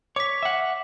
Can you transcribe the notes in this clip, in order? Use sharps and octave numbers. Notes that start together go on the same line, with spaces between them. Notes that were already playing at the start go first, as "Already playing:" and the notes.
C#5 D6 B6
E5 F#5